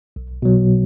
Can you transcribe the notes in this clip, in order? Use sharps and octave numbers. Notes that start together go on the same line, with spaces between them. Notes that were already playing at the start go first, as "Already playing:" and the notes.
B1
B2 F#3